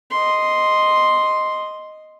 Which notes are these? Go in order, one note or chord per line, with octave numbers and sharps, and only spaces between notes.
D#5 C6